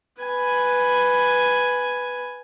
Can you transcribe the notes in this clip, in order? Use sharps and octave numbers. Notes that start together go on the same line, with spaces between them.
B4 G#5